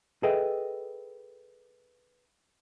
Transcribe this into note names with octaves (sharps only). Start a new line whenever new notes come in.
G#4 A4 B4 D#5 E5 G5